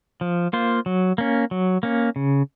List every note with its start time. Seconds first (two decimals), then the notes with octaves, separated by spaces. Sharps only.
0.21 F3
0.53 A#3 F4 C5
0.86 F#3
1.18 A#3 C#4
1.51 F#3
1.83 A#3 C#4
2.16 C#3